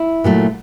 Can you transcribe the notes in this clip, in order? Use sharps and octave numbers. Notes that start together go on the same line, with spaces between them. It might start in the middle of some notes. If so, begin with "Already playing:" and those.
Already playing: E4
A#2 F#3 A3